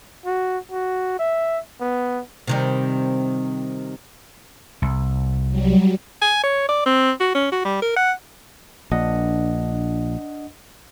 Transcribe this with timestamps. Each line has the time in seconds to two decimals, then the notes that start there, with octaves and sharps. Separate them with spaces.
0.26 F#4
0.71 F#4
1.19 E5
1.81 B3
2.47 C3 D#3 G3
4.82 C2
5.50 F#3 G3
6.22 G#5
6.43 C#5
6.69 D5
6.86 C4
7.21 F#4
7.35 C#4
7.52 F#4
7.65 G3
7.82 A#4
7.96 F#5
8.92 A#1 D4 D#5 F#5